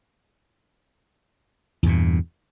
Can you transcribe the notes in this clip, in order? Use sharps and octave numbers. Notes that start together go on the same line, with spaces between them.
E2 G2 A#2